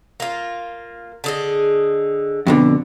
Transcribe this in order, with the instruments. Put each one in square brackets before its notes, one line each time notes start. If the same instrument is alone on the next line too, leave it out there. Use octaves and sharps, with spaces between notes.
[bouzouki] A#3 F4
D3 G#4 D#5
[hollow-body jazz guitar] F2 B2 D3